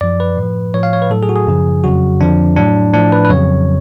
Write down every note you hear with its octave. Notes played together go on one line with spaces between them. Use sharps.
F#2 F3 D5
B4
A2
F3
A2 F3 C#5
F5
C#5
B4
A2 F#3 A4
G#4
F#4
G#4
F#2 C#3 F3
F2 C#3 F#3 F#4
F2 D3 F3 D4
A2 F#3 D4
A2 F3 D4
B4
B4
F2 C#3 F#3 C#5